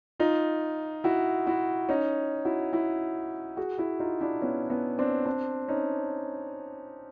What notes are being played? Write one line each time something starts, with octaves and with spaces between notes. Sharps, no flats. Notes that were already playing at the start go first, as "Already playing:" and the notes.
D#4 F4
E4 F#4
E4 F#4
C#4 D#4
E4 F#4
E4 F#4
F#4 G#4
E4 F#4
D#4 F4
D4 E4
B3 C#4
B3 C#4
C4 D4
C4 D4
C#4 D#4